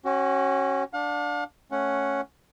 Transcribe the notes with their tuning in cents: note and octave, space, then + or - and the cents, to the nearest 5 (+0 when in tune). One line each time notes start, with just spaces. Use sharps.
C#4 -20 F#4 +25
D4 +0 F5 +45
A3 +0 C#4 +0 F#5 +0